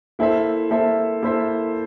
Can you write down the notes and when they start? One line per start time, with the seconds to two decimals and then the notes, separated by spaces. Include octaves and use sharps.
0.19 A#3 E4 A4 C5 E5
0.71 A#3 E4 A4 C5 E5
1.23 A#3 E4 A4 C5 E5